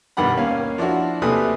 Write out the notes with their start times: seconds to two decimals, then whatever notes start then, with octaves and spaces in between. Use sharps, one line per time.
0.17 B1 G2 D#3 G4 F#5 B5
0.37 D#2 A#3 C#4 F5
0.78 F3 D4 E4 F#4
1.22 D#2 C3 A3 B4 G#5 D#6